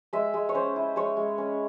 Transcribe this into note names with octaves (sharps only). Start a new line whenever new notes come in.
G#3 E5
G#3
C#5
C#4 C5
E4
G#3 C#5
G#3
C#4